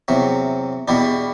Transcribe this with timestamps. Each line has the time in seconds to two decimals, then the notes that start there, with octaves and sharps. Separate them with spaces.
0.08 E2 C3 F#3
0.88 E2 B2 G3 D4